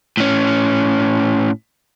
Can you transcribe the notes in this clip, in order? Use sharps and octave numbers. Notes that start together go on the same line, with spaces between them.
A2 C#4